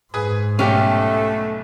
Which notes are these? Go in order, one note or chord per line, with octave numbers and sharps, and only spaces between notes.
G#2 G#4 B4 D#6
B1 B2 A3 C#4 G4 B6